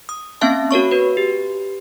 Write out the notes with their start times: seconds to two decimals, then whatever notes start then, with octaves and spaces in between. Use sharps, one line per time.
0.09 D#6
0.41 A#3 C4 C#4 E5 F5 A5
0.71 F#4 A#4 C#5 C#6
0.91 F#4 B4
1.17 G4